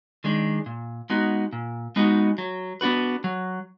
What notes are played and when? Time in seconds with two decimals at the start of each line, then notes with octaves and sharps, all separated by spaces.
0.24 D#3 G#3 D4
0.66 A#2
1.10 G#3 B3 D#4 F#4
1.53 A#2
1.96 G#3 B3 D#4 F#4
2.38 F#3
2.81 B3 D4 F#4 B4
3.24 F#3